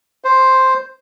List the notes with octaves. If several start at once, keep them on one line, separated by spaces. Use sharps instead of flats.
C5